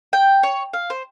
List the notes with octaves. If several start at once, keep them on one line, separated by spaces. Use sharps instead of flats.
G5
C#5
F5
C5